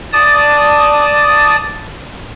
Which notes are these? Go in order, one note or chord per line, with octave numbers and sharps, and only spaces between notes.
D5 A5 D#6